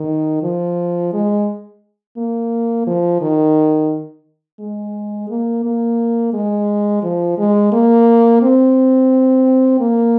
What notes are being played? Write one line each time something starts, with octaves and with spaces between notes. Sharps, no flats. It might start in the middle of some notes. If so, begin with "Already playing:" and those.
Already playing: D#3
F3
G#3
A#3
F3
D#3
G#3
A#3
A#3
G#3
F3
G#3
A#3
C4
A#3